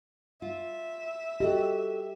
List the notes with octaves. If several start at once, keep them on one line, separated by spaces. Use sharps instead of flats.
F4 E5
F#4 G4 A4 D#5